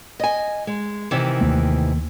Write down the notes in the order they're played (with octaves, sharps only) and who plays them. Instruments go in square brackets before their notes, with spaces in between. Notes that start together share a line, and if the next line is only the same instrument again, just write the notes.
[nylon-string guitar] D#5 G#5
G#3
C3 D#3 E3
[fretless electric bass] D#2 A3 A#3